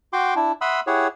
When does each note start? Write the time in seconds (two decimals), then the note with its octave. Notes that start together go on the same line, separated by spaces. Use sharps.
0.13 F#4 G5 C6 D6
0.36 D4 E4
0.61 E5 F#5 B5 C6 D#6 E6
0.87 E4 G4 G#4 C#5 F#5